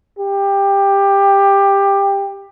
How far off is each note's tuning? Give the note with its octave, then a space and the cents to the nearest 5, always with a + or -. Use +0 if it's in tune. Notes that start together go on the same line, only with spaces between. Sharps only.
G4 +15